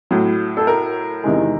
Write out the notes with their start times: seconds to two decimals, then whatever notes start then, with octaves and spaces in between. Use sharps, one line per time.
0.11 A2 F#3
0.57 A4
0.67 A#4
1.24 E2 C3 D#3 G#3